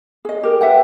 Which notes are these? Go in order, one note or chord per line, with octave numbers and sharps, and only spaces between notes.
G#4 D#5
G4 A#4
B4 E5 F#5 G5